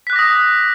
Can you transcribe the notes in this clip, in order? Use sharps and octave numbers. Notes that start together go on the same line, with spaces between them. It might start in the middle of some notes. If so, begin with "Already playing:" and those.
D6 D#6 F#6 A#6 B6